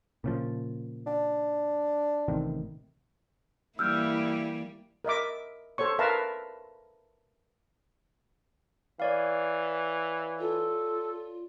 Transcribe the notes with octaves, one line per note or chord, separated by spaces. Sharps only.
A#2 C#3 F3
D4
A1 C3 D#3
E3 G3 A#3 E4 E6 F6 G6
A#4 D#5 E5 D6
A4 C5 C#5 C#6
A#4 B4 E5 F5 A5 A#5
E3 C#5 D5 F5
F4 A4